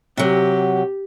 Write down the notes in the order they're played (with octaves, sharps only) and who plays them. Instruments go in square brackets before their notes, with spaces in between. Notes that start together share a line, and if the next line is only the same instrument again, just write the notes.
[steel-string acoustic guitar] C3 F#3 [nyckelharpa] G4